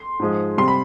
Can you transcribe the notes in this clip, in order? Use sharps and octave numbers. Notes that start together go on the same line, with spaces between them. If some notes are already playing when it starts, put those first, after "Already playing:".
Already playing: C6
G#2 F3 G#3
C3 G3 C6
B5